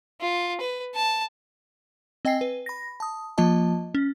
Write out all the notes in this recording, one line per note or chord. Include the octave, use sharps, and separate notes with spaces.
F4
B4
A5
C4 D#5 G5 G#5 C7
B4
B5 A#6
A5 D#6
F3 A#3 F4 D#5 A5
C#4